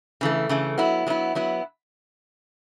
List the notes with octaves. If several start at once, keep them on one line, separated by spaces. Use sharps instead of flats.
C#3 E3 A3
C#3 E3 A3
F#3 B3 E4
F#3 B3 E4
F#3 B3 E4